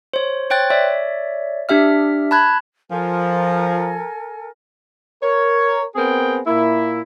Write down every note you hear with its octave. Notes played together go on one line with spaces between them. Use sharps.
C5 C#5
C5 C#5 G5 F#6 A6
C#5 D5 E5
D4 G4 E5 F6
A5 B5 F#6 G#6
F3 A4 A#4 G#5
A#4 C#5
B3 C4 G#4 A#4 G5
A#2 A#3 E4